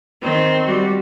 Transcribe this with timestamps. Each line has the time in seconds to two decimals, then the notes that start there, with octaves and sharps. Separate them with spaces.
0.23 D#3 C4
0.63 G3 F#4